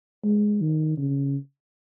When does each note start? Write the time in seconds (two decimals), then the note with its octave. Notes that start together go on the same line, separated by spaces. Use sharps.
0.24 G#3
0.61 D#3
0.97 C#3